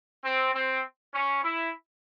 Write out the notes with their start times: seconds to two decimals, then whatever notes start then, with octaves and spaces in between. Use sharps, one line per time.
0.24 C4
0.55 C4
1.13 C#4
1.43 E4